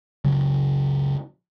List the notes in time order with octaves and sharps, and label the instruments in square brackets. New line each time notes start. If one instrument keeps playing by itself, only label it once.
[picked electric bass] F#1 C#2 C#3 F#3